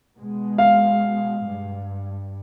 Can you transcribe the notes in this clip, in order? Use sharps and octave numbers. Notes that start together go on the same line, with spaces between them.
B2 G#3
F5
G2